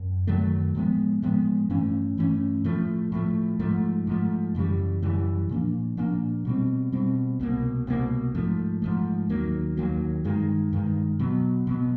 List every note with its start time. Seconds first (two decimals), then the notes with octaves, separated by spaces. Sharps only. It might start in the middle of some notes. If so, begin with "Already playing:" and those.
Already playing: F#2
0.27 F#2 D#3 F#3 A3
0.75 A2 F3 G#3 B3
1.22 A2 F3 G#3 B3
1.70 G2 E3 A3 C#4
2.17 G2 E3 A3 C#4
2.64 A2 F3 A3
3.12 A2 F3 A3
3.59 G#2 F3 A3
4.07 G#2 F3 A3
4.55 F#2 C#3 E3 G3
5.02 F#2 C#3 E3 G3
5.49 A#2 F3 A#3 D4
5.97 A#2 F3 A#3 D4
6.45 B2 G3 C4
6.92 B2 G3 C4
7.40 C2 B2 G3 A#3
7.87 C2 B2 G3 A#3
8.35 G#2 F3 A3
8.82 G#2 F3 A3
9.29 D#2 D#3 F#3 A#3
9.77 D#2 D#3 F#3 A#3
10.24 G2 D#3 G#3
10.73 G2 D#3 G#3
11.19 B2 F#3 B3
11.67 B2 F#3 B3